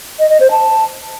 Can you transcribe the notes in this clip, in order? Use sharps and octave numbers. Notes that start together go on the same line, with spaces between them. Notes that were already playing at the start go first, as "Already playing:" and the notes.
D#5
D#5
C5
A5